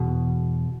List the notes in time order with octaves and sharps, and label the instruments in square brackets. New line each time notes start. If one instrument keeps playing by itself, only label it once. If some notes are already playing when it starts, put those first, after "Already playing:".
Already playing: [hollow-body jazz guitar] E2 B2